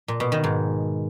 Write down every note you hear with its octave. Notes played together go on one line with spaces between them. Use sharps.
A#2
B2
D#3
G#2